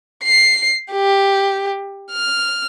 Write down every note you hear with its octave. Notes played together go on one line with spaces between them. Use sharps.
C7
G4
F6